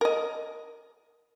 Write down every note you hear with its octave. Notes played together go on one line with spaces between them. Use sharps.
A#4 D#5